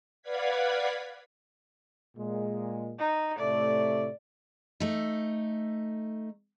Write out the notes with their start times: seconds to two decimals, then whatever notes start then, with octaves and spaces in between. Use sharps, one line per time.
0.22 B4 D5 F5 F#5 G#6 B6
2.17 A#2 G#3
2.99 D#4
3.39 A2 C3 A3 D5
4.80 A3 D#4